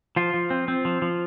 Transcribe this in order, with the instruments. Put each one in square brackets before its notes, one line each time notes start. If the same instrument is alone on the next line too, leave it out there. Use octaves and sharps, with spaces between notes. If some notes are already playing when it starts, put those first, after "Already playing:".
[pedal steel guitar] F3 F4
F3
C4
C4
F3
F3